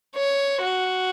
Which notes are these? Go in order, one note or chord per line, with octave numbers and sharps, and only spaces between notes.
C#5
F#4